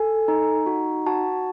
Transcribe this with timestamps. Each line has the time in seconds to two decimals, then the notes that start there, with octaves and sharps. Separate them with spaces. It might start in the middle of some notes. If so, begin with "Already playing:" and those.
Already playing: A4 G#5
0.28 D#4
0.66 F#4
1.06 F#4 A5